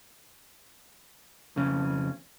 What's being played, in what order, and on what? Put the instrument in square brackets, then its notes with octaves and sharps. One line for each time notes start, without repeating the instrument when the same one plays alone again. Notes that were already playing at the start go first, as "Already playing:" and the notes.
[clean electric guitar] F2 C#3 C#4